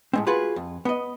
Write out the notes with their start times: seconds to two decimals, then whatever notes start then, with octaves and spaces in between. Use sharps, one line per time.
0.13 A2 G#3 C4
0.27 F4 F#4 G#4 B4 F5 B5
0.56 F2
0.85 B3 D#5